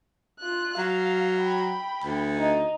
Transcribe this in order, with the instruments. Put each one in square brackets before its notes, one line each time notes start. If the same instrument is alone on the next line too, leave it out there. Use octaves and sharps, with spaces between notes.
[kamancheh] F4 F#6
[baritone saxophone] F#3 [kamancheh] F5
[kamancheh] G5 B5
[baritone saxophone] D2
[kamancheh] D#4